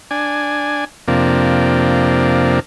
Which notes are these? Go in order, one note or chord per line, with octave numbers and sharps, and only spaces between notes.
D4 G#5
F2 C3 A#3 D4